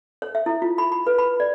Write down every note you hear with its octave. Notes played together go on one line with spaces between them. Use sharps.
C#5
E5
E4
F4
B5
B5
B4
B5
D5